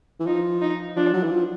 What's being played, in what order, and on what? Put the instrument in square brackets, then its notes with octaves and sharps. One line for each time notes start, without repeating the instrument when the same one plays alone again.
[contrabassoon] E3
[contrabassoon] F3 [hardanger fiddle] D#4
[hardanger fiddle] D#4
[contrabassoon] F3 [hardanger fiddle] D4
[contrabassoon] F#3
E3
F3